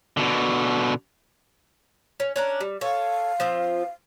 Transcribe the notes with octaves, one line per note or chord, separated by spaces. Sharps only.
B2 D3
C#4
C#4 D4 A#4
G3
A4 C#5 F5
F3 C4 F4